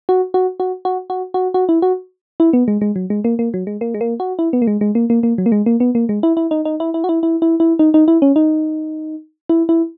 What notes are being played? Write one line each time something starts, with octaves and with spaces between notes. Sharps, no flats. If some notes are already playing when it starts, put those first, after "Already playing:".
F#4
F#4
F#4
F#4
F#4
F#4
F#4
E4
F#4
E4
B3
G#3
G#3
F#3
G#3
A#3
A#3
F#3
G#3
A#3
G#3
A#3
F#4
E4
B3
A#3
G#3
G#3
A#3
A#3
A#3
F#3
A#3
G#3
A#3
B3
A#3
G#3
E4
E4
D#4
D#4
E4
E4
F#4
E4
E4
E4
E4
D#4
D#4
E4
C#4
D#4
E4
E4